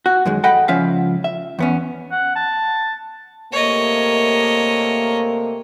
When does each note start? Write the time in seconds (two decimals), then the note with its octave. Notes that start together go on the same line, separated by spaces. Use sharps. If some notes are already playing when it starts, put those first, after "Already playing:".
0.06 F#4
0.26 F#2 D#3 G#3
0.44 A4 D#5 F#5 G5 B5
0.68 C#2 F3 C#4 E5 F5
1.24 E5
1.59 E2 B3 C#4
2.12 F#5
2.36 A5
3.53 C3 A3 A#3 C#5 D#5